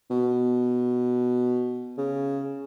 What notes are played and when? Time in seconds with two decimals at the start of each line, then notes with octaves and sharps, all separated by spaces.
0.11 B2
1.98 C#3